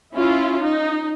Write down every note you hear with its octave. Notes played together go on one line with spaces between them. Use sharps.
C#4 E4 F4
D#4